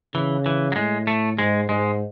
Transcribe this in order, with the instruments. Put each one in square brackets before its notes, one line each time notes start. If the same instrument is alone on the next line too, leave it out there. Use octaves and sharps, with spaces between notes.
[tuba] C#3 [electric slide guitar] E3
[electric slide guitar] E3
F#3
[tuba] A2 [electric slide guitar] G#3
[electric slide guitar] A3
[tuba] G#2 [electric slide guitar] G#3
[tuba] G#2 [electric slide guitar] G#3